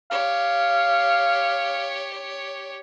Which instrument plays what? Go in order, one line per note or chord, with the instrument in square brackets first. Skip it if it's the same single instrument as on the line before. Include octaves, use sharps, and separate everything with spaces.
[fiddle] G4 C#5 [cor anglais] F5